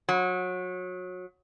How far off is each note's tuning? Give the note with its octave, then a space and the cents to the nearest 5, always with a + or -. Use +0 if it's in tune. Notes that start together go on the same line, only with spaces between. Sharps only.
F#3 -25